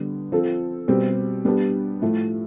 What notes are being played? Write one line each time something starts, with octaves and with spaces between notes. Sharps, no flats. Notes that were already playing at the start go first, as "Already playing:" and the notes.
Already playing: D3 G3 B3
F3 C4 F4 A4
B2 G3 C4 G4
G3 B3 D4 G4
A2 F3 A3